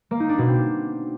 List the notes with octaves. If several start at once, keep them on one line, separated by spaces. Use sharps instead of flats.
A#3
D#4
D4
B2
C4